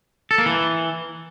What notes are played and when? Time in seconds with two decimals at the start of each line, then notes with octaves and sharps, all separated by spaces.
0.31 A4
0.38 A#3
0.46 E3